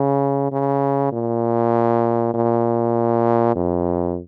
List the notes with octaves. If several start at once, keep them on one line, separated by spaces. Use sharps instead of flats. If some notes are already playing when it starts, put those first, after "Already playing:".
Already playing: C#3
C#3
A#2
A#2
F2